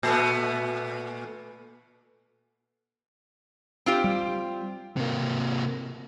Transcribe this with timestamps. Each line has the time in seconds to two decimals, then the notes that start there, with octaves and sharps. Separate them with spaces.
0.03 A#2 A3 B3
3.86 C4 F4 G4
4.04 G3
4.96 C3 A#3